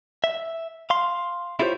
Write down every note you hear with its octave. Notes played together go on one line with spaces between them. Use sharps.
E5
F5 C6
E4 F4 G4 A4 C5 C#5